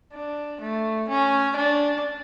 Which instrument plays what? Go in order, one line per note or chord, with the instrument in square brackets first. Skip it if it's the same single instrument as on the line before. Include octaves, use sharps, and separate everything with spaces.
[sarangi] D4
A3
C#4
D4